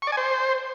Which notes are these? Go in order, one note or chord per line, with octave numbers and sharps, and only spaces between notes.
C#6
D5
G#5
C5